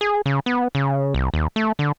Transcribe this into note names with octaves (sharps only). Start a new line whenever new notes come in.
G#4
C#3
B3
C#3
C2
D#2
A3
D3